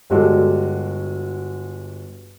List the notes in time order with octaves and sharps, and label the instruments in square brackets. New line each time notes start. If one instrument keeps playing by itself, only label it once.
[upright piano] G1 G3 G#3 F#4 A4